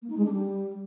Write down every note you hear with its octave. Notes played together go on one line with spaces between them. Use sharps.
A#3
D#4
G#3
D4
G3